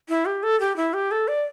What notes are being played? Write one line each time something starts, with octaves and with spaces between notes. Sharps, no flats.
E4
G4
A4
G4
E4
G4
A4
D5